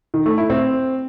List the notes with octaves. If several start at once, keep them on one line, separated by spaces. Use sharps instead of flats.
D#3
A3
E4
C4